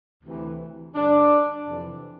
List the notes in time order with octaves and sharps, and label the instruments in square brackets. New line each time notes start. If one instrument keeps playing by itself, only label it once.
[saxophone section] D2 C3 E3
G2 D3 D4
F2 C3 E3